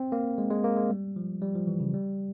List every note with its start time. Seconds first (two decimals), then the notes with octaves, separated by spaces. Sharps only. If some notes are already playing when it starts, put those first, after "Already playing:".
Already playing: C4
0.12 A#3
0.38 G#3
0.51 G#3
0.64 A#3
0.77 G#3
0.90 G3
1.16 F3
1.42 G3
1.55 F3
1.67 E3
1.80 C#3
1.94 G3